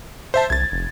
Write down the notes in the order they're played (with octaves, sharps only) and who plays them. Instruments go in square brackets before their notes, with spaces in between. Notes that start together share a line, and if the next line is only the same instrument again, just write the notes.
[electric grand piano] C5 E5 A5
[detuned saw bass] C2 [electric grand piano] G#6 A6
[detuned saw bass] F1